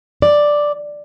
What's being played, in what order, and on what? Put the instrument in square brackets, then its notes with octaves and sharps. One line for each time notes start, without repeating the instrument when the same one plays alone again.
[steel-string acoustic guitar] D5